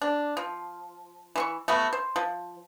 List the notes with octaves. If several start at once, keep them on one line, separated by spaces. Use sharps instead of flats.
D4
F3
E3 C6 C#6
A3 B3 F#4 F#5
C5
F3